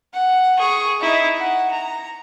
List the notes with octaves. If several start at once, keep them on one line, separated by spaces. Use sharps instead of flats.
F#5
G#4 C#6
D#4 E4
F#5
A#5